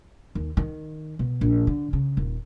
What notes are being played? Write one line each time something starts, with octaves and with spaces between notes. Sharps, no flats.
D#2
D#3
B2
A#1
D3
C#3
D#1